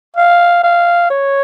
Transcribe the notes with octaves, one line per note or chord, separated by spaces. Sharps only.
F5
F5
C#5